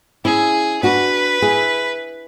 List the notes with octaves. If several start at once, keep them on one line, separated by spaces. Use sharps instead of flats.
C#4 E4 G#4
D4 F#4 B4
E4 G#4